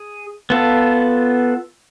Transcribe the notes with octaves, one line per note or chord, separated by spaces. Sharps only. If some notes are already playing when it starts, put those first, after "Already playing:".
Already playing: G#4
B3 F4 A4